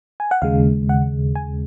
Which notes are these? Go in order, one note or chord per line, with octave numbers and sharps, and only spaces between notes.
G#5
F#5
D#2 C#3 G#3 F5
F#5
G#5